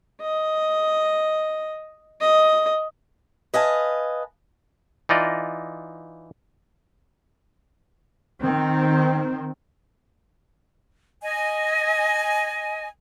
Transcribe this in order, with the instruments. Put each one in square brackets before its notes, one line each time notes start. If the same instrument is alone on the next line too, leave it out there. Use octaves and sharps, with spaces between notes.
[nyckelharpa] D#5
D#5
[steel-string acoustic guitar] B4 D#5 F5 G#5 A5
[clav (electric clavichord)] E3 D#4 F4 D5 D#5
[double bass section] D#3 C4
[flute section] D#5 G#5